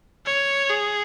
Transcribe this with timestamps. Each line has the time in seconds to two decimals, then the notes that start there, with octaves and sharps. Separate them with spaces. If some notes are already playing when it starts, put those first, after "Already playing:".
0.26 C#5
0.70 G#4